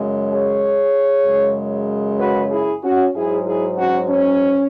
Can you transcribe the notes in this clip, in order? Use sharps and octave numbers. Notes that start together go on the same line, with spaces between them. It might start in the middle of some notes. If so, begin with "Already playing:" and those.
Already playing: F#2 C#3 G#3
G#4 C#5
F#2 C#3 G#3
F#4 B4
E4 G#4
C#4 F#4
G#2 F#3 E4 G#4
E4 G#4
C#4 F#4
C#4